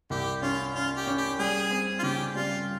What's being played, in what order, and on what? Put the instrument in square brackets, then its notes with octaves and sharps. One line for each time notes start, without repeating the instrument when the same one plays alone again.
[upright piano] C2 [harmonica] G4
[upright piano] C#4 [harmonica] F4
[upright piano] C#4 [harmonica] F4
[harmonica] G4
[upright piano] C#4
[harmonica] G4
[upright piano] G3 [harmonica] G#4
[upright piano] C4
[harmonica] F4
[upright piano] C#3 [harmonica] G4
[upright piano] G3 [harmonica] F4